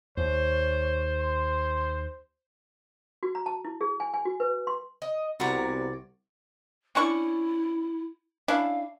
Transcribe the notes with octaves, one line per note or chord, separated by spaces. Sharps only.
D#2 C5 C#5
C6
F#4
A#5
A5
E4
G#4
G#5
G#5
F#4
B4
C6
D#5
C2 C3 B3 F#4 C#5 D5 A#5
C#4 D4 E4 C#6
C#4 D4 E4 F5